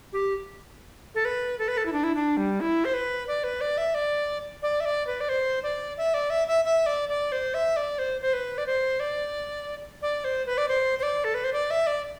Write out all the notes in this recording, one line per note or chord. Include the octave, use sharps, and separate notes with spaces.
G4
A4
B4
A4
B4
A4
E4
D4
E4
D4
G3
E4
C5
B4
D5
B4
D5
E5
D5
D5
E5
D5
B4
D5
C5
D5
E5
D5
E5
E5
E5
D5
D5
C5
E5
D5
C5
C5
B4
D5
C5
D5
D5
C5
B4
D5
C5
C5
D5
A4
B4
C5
D5
E5
D5